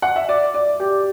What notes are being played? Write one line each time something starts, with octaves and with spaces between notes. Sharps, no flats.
F#5
E5
D5
D5
G4